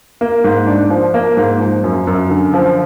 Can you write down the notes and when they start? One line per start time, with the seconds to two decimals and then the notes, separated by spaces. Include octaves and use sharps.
0.21 A#3
0.44 G#2
0.67 D4
0.90 F3
1.14 A#3
1.37 G#2
1.60 F3
1.84 F#2
2.07 F#2
2.30 D3
2.54 F3